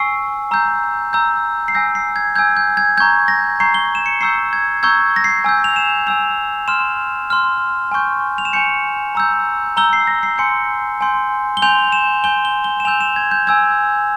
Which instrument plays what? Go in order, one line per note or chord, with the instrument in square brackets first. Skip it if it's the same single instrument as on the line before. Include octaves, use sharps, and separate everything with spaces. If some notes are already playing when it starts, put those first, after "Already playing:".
Already playing: [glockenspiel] G#5 C#6 E6 C7
A#5 E6 G6
A#5 E6 G6
C7
G#5 E6 G6 A#6
C7
G#6
G#5 E6 G6 G#6
G6
G#6
A#5 C#6 G6 G#6
A#6
A#5 C#6 G6 C7
G7
E7
C#7
A#5 C#6 E6 G6 C7
G#6
A#5 C#6 E6 G6 G#6
A#6
C7
G#5 E6 G6
F7
E7
G#5 E6 G6 F7
C6 F6 E7
C6 F6
G#5 C#6 G6
F7
E7
G#5 C#6 G6 C#7
A#5 E6 G6
A#5 E6 G6 G7
C7
A#6
C7
G#5 C6 G6 C#7
G#5 C6 G6
G7
G#5 C6 G6 F7
E7
G#5 C6 G6 G7
G7
G7
E7
G#5 E6 G6 F7
E7
G#6
G6
G#5 E6 G6 G#6